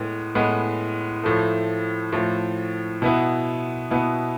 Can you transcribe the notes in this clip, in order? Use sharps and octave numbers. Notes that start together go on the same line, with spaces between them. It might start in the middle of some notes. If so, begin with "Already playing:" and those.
Already playing: A2 G#3 B3
A2 G#3 B3
A2 F3 A3
A2 F3 A3
B2 B3 E4
B2 B3 E4